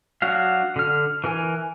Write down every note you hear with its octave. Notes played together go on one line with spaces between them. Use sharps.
F#3 D4 F#4 F5
D3 F6
E3 A#4 G#5